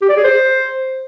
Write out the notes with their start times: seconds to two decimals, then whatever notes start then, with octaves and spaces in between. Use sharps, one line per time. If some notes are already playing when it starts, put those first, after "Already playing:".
0.02 G4
0.09 D5
0.17 G#4
0.24 C5